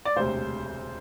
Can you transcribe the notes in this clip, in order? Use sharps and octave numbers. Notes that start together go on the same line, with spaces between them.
D5
E1 D2 C3 C5